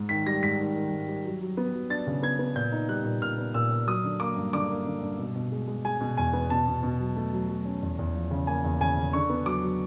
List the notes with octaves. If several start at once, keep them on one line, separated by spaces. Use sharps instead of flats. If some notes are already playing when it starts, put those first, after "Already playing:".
Already playing: G#2
D#3 B6
G3 A#6
G#2 B6
D#3
D#3
G#2
G3
F#3
F#3
B3
F#3
D4 A6
C#3
B3 G#6
B3
A#2 G6
D#4
G3 F#6
A#2
A#2 F6
B3
A#2 E6
A#2
F#3 D#6
D3
A#3 D6
G2
D3 D6
A#3
D3
G2
B2
B2
G#3
G#3
G#3 G#5
B2
E2 G#5
B3
B2 A5
B2
B2
F#3
A3
F#3
F#3
C#4
E2
E2
F3
C#3
A#3 G#5
E2
C#3 G#5
C#3
D3 C#6
B3
F#3 D6
F#3